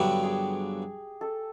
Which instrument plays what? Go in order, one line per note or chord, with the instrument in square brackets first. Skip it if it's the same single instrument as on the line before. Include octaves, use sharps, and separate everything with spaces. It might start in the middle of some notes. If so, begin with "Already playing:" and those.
Already playing: [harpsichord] G2 D3 F#3 B3 [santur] G4
[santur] G#4
A4